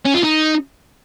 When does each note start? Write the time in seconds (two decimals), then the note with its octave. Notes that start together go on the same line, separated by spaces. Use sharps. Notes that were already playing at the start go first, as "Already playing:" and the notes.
0.05 C#4
0.14 F4
0.23 D#4